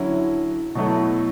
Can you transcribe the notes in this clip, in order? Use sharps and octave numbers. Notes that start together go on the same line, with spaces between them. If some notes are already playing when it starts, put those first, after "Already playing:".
Already playing: D3 F#3 C#4 E4
B2 F#3 A3 E4